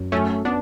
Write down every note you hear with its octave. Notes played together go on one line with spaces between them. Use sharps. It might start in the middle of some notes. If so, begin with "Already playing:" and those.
Already playing: F#2
F#3 A3 C#4
B3 C#4 D4